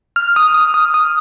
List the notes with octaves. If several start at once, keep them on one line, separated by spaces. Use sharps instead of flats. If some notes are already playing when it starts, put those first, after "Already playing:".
F6
D#6
D#6
D#6
D#6